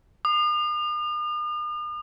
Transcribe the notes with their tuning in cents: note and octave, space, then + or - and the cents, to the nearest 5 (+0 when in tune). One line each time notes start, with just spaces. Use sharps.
D#6 -45